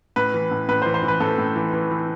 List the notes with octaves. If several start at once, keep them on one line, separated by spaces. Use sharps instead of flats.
A2 B4
E3
A2
A2 B4
C5
E3
C5
E3
B4
A2 A4
A2
E3
E3
E3